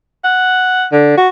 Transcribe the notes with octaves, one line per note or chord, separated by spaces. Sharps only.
F#5
D3
F#4